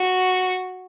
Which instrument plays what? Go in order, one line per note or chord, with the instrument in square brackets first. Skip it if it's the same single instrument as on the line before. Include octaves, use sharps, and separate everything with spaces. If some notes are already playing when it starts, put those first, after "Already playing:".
Already playing: [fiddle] F#4